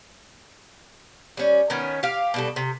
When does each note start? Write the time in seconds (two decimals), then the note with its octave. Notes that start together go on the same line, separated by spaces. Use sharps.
1.37 G3 C#4
1.70 D#3 B3 C#4
2.03 G4 F5
2.34 B2 G3 A4
2.56 C3